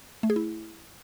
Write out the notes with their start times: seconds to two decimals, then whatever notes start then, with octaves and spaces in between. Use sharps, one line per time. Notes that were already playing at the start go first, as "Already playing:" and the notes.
0.23 A3
0.30 G#4
0.36 E4